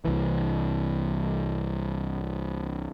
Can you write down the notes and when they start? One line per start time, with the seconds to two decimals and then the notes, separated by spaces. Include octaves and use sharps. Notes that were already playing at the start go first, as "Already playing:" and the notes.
0.05 C2 E3